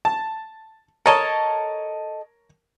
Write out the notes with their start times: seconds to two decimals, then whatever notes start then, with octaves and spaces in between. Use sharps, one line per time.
0.05 A5
1.06 A4 A#4 C#5 D#5 A5